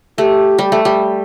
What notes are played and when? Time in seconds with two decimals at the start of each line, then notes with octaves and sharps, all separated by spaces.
0.18 A3 G4
0.59 G3
0.72 A3
0.85 G3